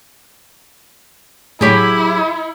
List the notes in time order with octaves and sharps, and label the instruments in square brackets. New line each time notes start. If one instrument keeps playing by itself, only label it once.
[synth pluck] A2 C#5 D7 [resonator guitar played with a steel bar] F#3 G4 G#4 [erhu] E4